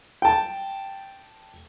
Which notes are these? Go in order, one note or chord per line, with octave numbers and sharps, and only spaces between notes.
G5 A5